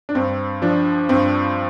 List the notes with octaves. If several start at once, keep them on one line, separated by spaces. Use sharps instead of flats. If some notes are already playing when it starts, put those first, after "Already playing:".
D4
G2 C4
F3 D4
G2 C4